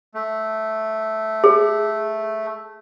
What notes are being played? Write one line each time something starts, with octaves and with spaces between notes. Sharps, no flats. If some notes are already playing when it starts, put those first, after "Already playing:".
A3
G#4